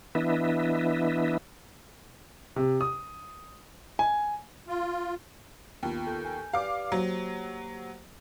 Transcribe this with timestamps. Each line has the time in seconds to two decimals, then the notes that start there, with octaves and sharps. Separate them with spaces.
0.15 E3 B3 D4 E4 D#5 E5
2.56 C3
2.81 D#6
3.99 G#5
4.68 F4
5.83 D#2 B3 F4
6.07 A4 C#6 G6
6.24 G#5 G6
6.53 G4 B4 D5 F5 D6
6.92 F#3 A#3 G4 C5